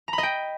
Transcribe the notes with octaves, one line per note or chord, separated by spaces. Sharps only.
A#5
B5
D#5
G5